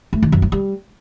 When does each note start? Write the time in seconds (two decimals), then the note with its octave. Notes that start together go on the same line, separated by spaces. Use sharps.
0.13 A3
0.22 D#3
0.32 F#2
0.42 F#3
0.52 G3